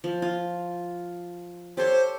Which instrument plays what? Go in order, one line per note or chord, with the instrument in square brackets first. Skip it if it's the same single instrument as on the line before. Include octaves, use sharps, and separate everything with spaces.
[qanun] F3
F4
[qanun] G4 A4 C#5 [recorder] C5